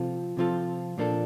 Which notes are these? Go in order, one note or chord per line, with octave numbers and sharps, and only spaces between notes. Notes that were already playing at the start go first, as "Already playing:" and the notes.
Already playing: C3 F3 C4 F4 A4
C3 F3 C4 F4 A4
A#2 F3 A#3 D4 A4